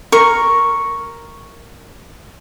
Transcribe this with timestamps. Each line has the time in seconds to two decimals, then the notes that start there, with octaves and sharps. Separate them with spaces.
0.12 A#4 C#6